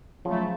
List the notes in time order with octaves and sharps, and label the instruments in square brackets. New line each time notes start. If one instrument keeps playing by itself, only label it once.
[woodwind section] C#3 F#3 A3 [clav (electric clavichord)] F3